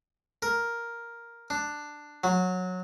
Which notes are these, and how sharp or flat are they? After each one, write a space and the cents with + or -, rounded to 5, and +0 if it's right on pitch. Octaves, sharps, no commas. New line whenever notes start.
A#4 +5
D4 +10
F#3 -15